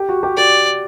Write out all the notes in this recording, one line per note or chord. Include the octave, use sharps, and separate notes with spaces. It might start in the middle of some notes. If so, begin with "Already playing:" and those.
Already playing: G4
F#4
G4
G4 D5